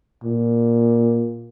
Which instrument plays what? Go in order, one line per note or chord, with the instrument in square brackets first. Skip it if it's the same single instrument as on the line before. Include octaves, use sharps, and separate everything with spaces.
[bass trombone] A#2